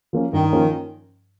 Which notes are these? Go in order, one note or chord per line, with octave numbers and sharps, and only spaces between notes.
F3 A#3 C#4
G2 D#3
F3 A#3 C#4